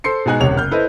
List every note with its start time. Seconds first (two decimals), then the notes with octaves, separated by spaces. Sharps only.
0.04 A4 C5 C6 C7 C#7
0.26 B2 G#3 D#4 G#5 F#6
0.40 E1 C#2 C3 C#5 F7
0.56 F#1 F6 G6
0.71 E4 A4 B4 C5 D#5